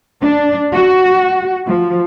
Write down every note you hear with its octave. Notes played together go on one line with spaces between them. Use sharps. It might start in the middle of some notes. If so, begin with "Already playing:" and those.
D4
F#4
F3